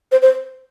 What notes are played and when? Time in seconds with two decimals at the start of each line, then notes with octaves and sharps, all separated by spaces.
0.12 C5
0.22 C5